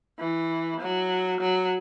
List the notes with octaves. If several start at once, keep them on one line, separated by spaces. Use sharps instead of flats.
E3
F#3
F#3